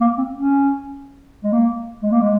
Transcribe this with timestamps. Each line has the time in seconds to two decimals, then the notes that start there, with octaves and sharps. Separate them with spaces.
0.01 A#3
0.18 C4
0.34 C#4
1.44 G#3
1.52 A#3
2.02 G#3
2.12 A#3
2.21 G#3